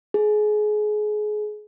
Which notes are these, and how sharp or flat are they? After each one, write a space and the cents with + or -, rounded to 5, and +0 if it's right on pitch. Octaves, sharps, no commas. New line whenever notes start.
G#4 +25